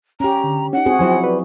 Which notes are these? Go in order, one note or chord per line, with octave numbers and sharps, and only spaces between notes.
C#4 G4 A#5
D3
C#4 D#4 F#5
C4 F#4 G#4
F3 F#3 E4 F#4 C5 G#5
B4 D5